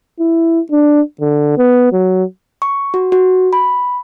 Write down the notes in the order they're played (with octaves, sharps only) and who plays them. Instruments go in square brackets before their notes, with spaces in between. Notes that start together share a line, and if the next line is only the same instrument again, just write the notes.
[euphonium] E4
D4
D3
B3
F#3
[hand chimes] C#6
F#4
F#4
B5